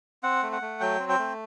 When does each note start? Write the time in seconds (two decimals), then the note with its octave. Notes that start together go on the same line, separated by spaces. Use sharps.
0.23 C4 F#5
0.43 A3
0.52 F#5
0.61 A3
0.80 F#3 G5
1.00 C4
1.09 G5
1.19 A3